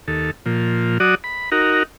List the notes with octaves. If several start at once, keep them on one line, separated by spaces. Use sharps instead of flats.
D#2 A4
A#2 F3
F#3 F#4 D5 D#6
B5
D#4 F#4 A#4